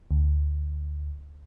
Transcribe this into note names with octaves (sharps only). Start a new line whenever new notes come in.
D2